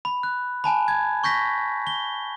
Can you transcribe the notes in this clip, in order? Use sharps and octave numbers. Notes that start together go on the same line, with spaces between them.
B5
F#6
G#5 A5 B5
G#6
C#6 G6 A#6 B6
G7